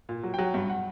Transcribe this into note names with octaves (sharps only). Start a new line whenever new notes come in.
A#2
F#3
F#3 G5
G2
F#5